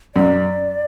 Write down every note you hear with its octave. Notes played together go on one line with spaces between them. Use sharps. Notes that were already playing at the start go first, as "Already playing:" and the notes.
F#2 D5